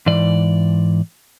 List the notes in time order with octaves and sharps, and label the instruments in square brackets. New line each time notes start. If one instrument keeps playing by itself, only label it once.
[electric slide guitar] G#2 E3 D5